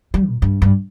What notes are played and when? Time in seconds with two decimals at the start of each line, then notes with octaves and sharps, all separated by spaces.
0.14 G3
0.28 A#2
0.42 G2
0.62 G2